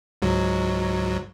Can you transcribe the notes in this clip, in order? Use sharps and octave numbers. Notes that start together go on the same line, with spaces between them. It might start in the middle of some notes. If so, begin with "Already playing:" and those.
C#2 G#2 F#3